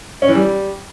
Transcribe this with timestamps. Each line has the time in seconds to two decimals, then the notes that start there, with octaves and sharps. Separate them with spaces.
0.22 C#4
0.29 E3
0.35 G3